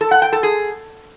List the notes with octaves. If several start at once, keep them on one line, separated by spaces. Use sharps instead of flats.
A4
F#5
G5
A4
G#4